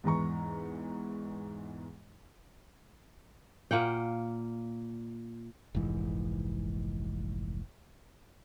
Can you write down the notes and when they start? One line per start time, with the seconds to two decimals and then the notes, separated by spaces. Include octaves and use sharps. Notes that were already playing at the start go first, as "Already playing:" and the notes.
0.04 E2 G#2 E3 A#5 C#6
3.71 A#2 A#3 F#5 G5
5.75 F1 A#1 G#2 E3